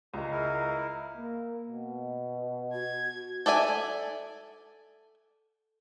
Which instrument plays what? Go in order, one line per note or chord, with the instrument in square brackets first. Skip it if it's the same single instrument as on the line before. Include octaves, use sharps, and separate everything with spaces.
[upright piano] C#2 G#3 [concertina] A#5
[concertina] E4 A#4
[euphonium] A#3
B2
[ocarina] F#4 [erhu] G#6
[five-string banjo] A4 D5 E5 G#5